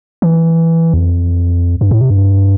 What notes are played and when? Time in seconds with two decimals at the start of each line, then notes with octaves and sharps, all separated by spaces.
0.22 E3
0.94 E2
0.97 F2
1.81 G2
1.91 A2
2.01 C3
2.10 G2